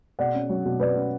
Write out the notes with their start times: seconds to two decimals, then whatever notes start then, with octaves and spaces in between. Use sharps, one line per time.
0.19 B2 D5 F#5
0.34 C#4
0.49 F#3
0.65 B2
0.80 B2 B4 D5
0.95 C#4